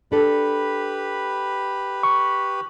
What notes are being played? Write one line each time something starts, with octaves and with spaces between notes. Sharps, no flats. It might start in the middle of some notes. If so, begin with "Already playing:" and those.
D4 G4 A4 B4 B5
C#6